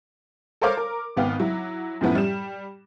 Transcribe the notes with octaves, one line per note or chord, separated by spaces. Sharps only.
A4 A#4 C5 C#5 F5 D6
A#4
G#1 B3 F5 G5
F#3 E4
F#2 A2 F3 B3 E4
G3 E7